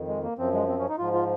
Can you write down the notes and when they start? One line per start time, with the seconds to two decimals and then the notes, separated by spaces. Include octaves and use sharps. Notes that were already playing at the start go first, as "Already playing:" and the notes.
Already playing: F2 D#3
0.08 G#3
0.23 A#3
0.38 F#2 F3 C4
0.54 G#3
0.68 C4
0.79 C#4
0.89 D#4
0.98 G#2 F3 F4
1.14 F4